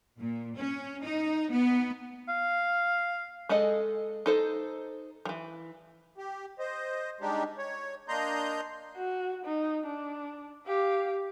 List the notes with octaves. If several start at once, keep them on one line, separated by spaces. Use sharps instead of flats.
A#2
C#4
D#4
B3
F5
G#3 G#4 A4 D#5
D#4 A4 C5
E3 F3
G4
C5 D#5
G3 G#3 D4 D#4 G4
C#5
A#3 D4 D#5 A#5 C6 G6
F#4
D#4
D4
G4 F5